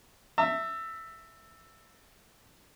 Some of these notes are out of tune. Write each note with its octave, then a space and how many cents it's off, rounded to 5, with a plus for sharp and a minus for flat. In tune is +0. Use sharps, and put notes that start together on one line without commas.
E5 +0 A5 +45